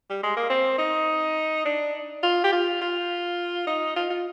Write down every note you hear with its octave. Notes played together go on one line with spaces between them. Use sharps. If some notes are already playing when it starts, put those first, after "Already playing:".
G3
G#3
A#3
C4
D#4
D4
F4
G4
F4
F4
D#4
F4
F4